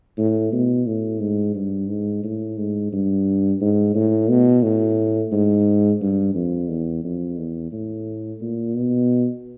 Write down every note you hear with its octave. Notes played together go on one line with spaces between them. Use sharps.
A2
B2
A2
G#2
G2
G#2
A2
G#2
G2
G#2
A2
B2
A2
G#2
G2
F2
E2
F2
E2
A2
A#2
B2